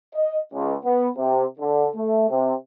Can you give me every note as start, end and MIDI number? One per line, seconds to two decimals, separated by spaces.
0.14 0.40 75
0.53 0.76 37
0.85 1.09 59
1.17 1.44 48
1.59 1.88 50
1.96 2.28 57
2.30 2.53 48